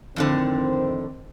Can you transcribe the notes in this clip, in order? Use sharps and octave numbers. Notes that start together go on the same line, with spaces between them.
F2 A2 D3 D#3 C4